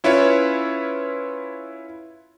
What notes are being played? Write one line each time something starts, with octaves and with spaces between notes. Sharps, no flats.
C#4 E4 F4 B4 C#5